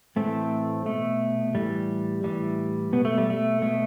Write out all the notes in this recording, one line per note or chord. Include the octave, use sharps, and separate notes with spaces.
A2 E3 A3 C4
B2 A3
A2 E3 G3
A2 E3 G3
B2 B3
A3
G3
A3
B2 A3